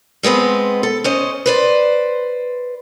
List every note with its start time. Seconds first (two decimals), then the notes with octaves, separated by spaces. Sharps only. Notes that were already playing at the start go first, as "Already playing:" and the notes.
0.23 G3 G#3 B3 C4 G#4
0.83 A4
1.04 C#4 C5 D#5
1.46 B4 C5 D5